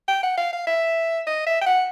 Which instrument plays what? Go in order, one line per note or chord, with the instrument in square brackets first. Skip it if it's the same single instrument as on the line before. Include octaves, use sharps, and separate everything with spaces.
[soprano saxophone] G5
F#5
F5
F5
E5
D#5
E5
G5
F#5